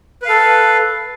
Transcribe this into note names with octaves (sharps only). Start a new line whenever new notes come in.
A4 B4 F5